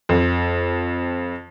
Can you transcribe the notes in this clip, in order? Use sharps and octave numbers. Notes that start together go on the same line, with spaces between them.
F2